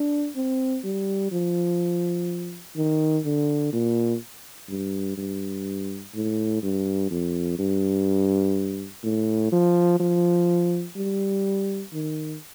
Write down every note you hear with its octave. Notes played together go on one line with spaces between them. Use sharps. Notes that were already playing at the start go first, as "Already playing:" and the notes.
Already playing: D4
C4
G3
F3
D#3
D3
A#2
G2
G2
A2
G2
F2
G2
A2
F3
F3
G3
D#3